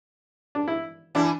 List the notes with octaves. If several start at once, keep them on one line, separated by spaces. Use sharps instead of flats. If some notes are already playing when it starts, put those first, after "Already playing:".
D4
E4
E3 D4 E4